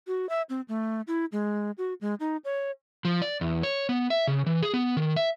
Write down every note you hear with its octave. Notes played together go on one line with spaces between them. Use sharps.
F#4
E5
C4
A3
E4
G#3
F#4
G#3
D#4
C#5
F3
D5
E2
C#5
B3
E5
C#3
E3
G#4
B3
D#3
E5